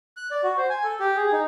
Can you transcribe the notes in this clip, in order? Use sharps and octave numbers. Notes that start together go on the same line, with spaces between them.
F#6
D5
F#4
C5
G#5
A4
G4
G#4
D#4